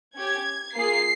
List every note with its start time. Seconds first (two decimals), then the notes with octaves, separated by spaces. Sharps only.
0.15 C#4 G4 G#6
0.74 A#3 F4 G#4 C7